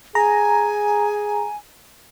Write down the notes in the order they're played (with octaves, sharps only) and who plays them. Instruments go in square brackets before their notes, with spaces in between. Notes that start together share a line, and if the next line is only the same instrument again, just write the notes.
[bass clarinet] G#4 [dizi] G#5 [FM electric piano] A#5